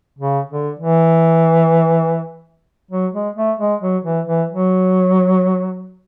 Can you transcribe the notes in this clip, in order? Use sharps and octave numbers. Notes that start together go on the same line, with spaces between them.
C#3
D3
E3
F#3
G#3
A3
G#3
F#3
E3
E3
F#3